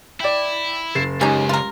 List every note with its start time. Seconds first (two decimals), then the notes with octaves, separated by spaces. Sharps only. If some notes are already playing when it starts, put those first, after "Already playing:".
0.20 E4 D5 G5
0.95 F#1 A6 C7 E7
1.21 C#2 G#3 C#4 D#4 G4
1.49 F4 A#4